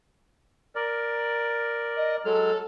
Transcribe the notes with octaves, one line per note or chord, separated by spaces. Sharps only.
A#4 D5
D#5
F#3 G#3 A4 F6